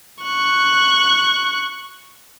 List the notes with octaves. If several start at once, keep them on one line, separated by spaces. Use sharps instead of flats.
C#6 F#6